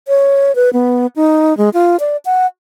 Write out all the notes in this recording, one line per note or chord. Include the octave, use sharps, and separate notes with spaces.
C#5
B4
B3
D#4
G#3
F4
D5
F#5